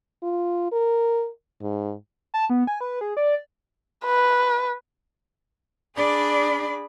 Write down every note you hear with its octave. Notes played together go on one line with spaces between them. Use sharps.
F4
A#4
G#2
A5
B3
G#5
B4
G#4
D5
B4
D4 G#4 D5 B5